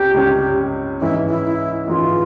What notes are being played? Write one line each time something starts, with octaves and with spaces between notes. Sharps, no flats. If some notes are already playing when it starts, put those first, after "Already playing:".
Already playing: C#2 C3 C#4 G4
C#2 C3 G3 C#4
G#2 E3 G#3 C#4 E4
E4
G#2 E3 G#3 C#4 F4